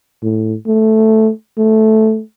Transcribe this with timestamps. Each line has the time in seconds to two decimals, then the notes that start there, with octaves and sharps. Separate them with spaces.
0.23 A2
0.67 A3
1.57 A3